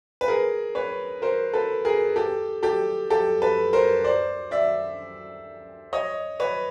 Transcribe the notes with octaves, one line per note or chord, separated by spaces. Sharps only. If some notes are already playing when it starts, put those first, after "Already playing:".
B4
G#4 A#4
B4 C#5
A#4 C5
A4 B4
G#4 A#4
G4 A4
G4 A4
G4 A4
A4 B4
A#4 C5
C5 D5
D5 E5
C#5 D#5
B4 C#5